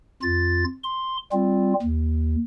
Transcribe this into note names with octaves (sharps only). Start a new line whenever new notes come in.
F2 F4 A6
C6
G3 C4 F4
D#2